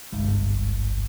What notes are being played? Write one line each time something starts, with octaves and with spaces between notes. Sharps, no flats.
G1 C2 G#2